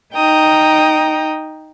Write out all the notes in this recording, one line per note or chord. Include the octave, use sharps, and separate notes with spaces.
D#4 G5 A#5 D#6